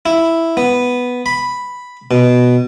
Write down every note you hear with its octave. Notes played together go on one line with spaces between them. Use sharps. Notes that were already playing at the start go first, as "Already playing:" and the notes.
E4
B3
B5
B2